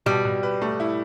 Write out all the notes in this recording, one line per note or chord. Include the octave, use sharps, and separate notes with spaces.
B2 G3
B2
B4
A3
E4